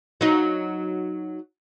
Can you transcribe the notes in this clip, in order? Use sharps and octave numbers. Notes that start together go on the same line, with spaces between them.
F#3 D#4